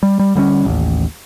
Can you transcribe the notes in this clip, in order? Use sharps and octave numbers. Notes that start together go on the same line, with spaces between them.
G3
G3
D3 G3 B3 C#4
A1 D#2